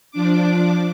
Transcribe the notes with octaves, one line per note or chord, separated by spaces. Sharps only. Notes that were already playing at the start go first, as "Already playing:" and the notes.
F3 D4 D6